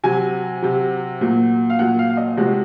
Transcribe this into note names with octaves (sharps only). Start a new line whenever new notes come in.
C3 F#3 G#5
C3 F#3
A#2 F#3
F5
A#2 F#3 F#5
F5
F5
D#5
C3 F3 G#3 F#4